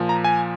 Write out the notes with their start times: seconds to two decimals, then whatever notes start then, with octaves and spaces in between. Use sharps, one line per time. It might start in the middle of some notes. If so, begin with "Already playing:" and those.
Already playing: A#2 F3
0.09 A#5
0.24 G#5